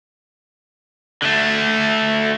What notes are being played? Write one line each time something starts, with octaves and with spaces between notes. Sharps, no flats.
D3 A3